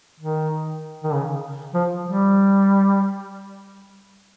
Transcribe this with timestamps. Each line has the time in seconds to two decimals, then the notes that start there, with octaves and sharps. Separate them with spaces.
0.20 D#3
1.04 D#3
1.13 C#3
1.74 F3
2.05 G3